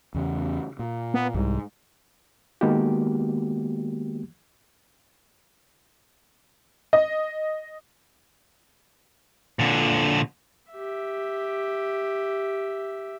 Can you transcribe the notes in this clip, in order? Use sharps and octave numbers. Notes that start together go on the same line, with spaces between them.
E2 C#3
A#2
B3
C2 G#2
D#3 G#3 A#3 B3 F#4 G4
D#5
A#2 D3
G4 E5